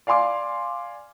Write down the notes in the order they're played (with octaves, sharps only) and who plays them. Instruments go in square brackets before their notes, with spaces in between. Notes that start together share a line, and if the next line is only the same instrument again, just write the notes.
[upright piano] D5 F5 G#5 C6 D6